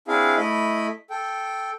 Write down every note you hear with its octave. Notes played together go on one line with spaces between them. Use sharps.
C4 D4 E4 G#4 F5
A3 E4 D#5 B5
A4 G5